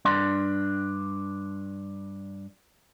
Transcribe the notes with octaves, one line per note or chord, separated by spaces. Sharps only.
G2 D4 C6